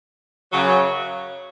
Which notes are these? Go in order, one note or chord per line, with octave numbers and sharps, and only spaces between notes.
F#2 C#3 F#3